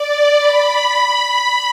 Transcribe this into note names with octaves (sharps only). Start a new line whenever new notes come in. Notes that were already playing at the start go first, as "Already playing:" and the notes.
Already playing: D5
B5